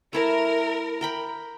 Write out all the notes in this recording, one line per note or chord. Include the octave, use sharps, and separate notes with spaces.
A3 E4 A#4 A5
A#4 G5 B5